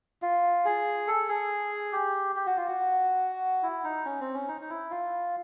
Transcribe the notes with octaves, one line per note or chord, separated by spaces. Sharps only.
F4
G#4
A4
G#4
G4
G4
F#4
F4
F#4
E4
D#4
C#4
C4
C#4
D#4
D#4
E4
F4